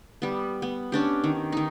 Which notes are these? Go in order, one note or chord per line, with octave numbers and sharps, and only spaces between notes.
G3 B3
B3
C#4 D4 G4
D#3
D#3 D#4